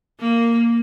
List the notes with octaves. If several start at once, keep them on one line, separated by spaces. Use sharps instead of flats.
A#3